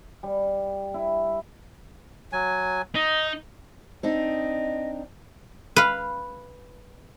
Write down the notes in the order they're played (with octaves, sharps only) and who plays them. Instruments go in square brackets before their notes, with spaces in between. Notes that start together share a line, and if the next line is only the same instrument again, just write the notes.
[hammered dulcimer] G3
E4
[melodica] F#3 G#5
[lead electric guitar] D#4 [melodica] D#5
[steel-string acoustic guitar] C4 D4 D#4 [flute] D#5
[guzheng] B4 F5